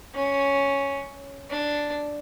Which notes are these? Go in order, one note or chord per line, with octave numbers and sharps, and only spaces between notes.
C#4
D4